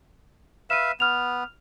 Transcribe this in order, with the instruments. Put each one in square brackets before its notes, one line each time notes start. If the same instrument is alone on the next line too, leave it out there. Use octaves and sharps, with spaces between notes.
[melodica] B4 E5 F5 [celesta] D#7 E7
[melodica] B3 [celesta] F6 F7